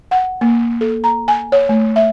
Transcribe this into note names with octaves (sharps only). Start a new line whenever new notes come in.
F#5
A#3
A4
A#5
G#5
C#5
A3
E5